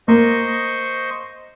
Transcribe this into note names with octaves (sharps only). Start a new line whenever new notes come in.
A#3 C5 D#5 C#6